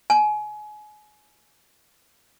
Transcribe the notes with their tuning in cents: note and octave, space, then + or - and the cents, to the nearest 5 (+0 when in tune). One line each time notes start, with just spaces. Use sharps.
G#5 +30